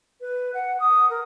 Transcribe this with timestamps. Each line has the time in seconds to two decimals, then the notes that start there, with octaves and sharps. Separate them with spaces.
0.21 B4
0.54 F#5
0.80 D#6
1.10 A#4